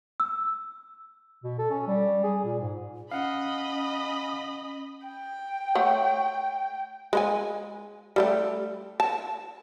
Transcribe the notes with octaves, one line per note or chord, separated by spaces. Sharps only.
E6
B2
A4
C#4
G3
G#4
A#2
G#2
C#4 D#5 F5 F#5 B5
G5
A3 C#5 F#5
G#3 C5 G#5
G3 A3 G4
A5